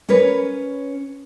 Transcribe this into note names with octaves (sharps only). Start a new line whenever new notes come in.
C#4 A#4 B4 C#5